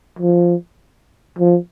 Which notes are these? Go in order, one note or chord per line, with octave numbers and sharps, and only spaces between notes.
F3
F3